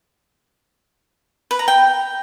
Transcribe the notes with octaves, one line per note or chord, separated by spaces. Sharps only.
B4
A#5
G5